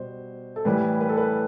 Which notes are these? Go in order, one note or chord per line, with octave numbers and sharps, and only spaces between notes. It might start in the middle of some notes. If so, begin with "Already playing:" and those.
Already playing: B2 G3 C5
A4
A2 E3 G3 B4
B4
A4
B4